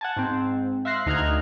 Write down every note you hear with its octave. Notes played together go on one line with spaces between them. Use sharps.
F#5 G#5 A5
G#2 C4
E5 F5 C6 F#6 A#6 C7
D2 D#4 A#5 F6 F#6 G#6